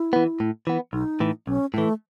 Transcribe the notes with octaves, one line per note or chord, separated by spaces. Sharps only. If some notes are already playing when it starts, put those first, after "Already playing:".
Already playing: E4
E3 B3
A2
E3 B3
B1 D#4
A2 E3
B1 C#4
A2 E3 A3